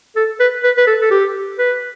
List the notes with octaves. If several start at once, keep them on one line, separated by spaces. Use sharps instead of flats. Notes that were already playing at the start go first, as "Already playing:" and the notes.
A4
B4
B4
B4
A4
A4
G4
B4